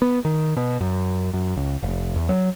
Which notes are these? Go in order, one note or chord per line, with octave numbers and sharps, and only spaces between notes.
B3
D#3
B2
F#2
F#2
C#2
F1
E2
F#3